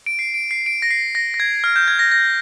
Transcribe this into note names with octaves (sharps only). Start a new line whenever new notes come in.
D7
C7
D7
C7
D7
A#6
C7
A#6
A#6
G#6
F6
G6
G#6
A#6
A#6